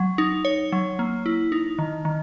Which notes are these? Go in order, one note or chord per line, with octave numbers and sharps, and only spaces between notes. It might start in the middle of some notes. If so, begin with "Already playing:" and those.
Already playing: F#3
D#4
C#5
F#3
A#3
E4
D#4
D#3
D#3